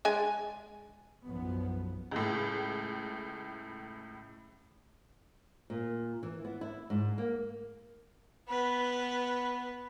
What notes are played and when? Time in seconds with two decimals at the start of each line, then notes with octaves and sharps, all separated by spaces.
0.05 G#3 D4 G#5
1.25 B1 F#2 F3 B3
2.11 C#2 A2
5.70 A#2
6.23 E3
6.45 B3
6.61 E4
6.90 G#2
7.18 A#3
8.49 B3 B4